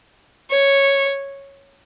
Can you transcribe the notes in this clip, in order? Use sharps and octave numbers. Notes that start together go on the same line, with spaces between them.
C#5